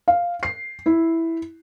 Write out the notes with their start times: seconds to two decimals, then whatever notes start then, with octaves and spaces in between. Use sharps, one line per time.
0.08 F5
0.43 C7
0.86 E4